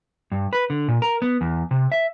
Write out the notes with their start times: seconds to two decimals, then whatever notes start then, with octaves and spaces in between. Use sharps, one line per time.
0.32 G2
0.53 B4
0.70 D3
0.88 A#2
1.02 A#4
1.22 B3
1.41 E2
1.71 C3
1.92 E5